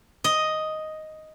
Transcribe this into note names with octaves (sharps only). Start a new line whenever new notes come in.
D#5